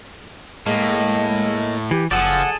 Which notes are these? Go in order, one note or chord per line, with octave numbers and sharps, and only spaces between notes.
A2 G#3 A#3 D#5
E3 G4
F#1 F3 G#4 A4 D5 F#5